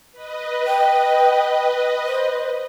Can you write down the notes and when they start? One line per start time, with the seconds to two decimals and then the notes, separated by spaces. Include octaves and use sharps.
0.12 B4 D#5
0.67 G5
2.06 C5